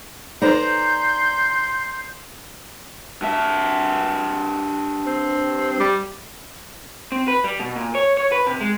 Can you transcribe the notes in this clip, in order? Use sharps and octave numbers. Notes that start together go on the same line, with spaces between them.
D#4 A4 B4 C5 D5 A#5 C6 G6
G2 E5 A5
C4
G3
C4
B4
G3
B2
A#2
C#5
C#5
B4
C3
G#3